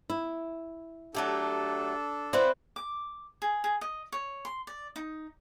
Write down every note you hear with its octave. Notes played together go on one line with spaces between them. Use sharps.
E4
F#3 A3 D4 G4 A4
C4 E4 B4 C5 D5 F#5
D6
G#4
G#4
D#5
C#5
C6
D5
D#4